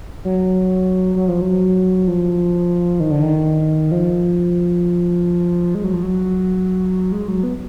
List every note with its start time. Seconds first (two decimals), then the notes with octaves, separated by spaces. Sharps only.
0.25 F#3
1.16 F#3
1.28 F3
1.41 F#3
2.08 F3
3.00 D#3
3.11 D3
3.22 D#3
3.92 F3
5.75 G#3
5.84 F#3
5.94 F3
6.03 F#3
7.12 G#3
7.28 F#3
7.43 B3